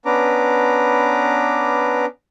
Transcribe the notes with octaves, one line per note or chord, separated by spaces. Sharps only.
B3 C#4 D4 B4 A#5 D6